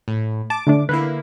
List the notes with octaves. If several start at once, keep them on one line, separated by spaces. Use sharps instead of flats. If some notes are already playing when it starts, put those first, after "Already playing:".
A2
A5 D6
D3 A3 D4
D3 A#3 E4 B4